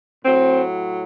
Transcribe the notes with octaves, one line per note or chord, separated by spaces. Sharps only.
A2 F#3 C4